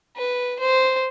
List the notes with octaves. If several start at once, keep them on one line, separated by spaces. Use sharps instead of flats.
B4
C5